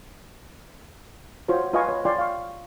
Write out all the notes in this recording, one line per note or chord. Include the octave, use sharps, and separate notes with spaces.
F4 F#4 C5 C#5
F4 B4 D#5 F5 G#5 C#6
C#5
F4 D5 F5 G5 G#5 C6
F5 C#6